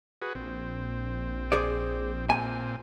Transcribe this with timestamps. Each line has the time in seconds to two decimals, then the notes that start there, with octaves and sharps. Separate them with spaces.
0.22 F#4 G#4 B4
0.35 A#1 C4
1.52 G#4 C5 D5
2.30 A#2 C4 G#5